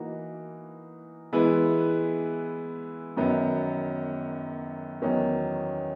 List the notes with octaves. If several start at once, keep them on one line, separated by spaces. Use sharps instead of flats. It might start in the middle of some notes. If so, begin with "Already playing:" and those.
Already playing: E3 A#3 D#4 F#4
E3 G#3 B3 E4 B4
F#2 D#3 F#3 B3
E2 D#3 F#3 C#4